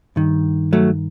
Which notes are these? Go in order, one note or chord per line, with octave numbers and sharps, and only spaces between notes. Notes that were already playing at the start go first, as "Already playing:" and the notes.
G2 D#3
F#3 A3